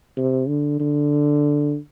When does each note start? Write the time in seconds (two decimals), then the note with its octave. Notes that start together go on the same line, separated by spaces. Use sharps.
0.17 C3
0.48 D3
0.80 D3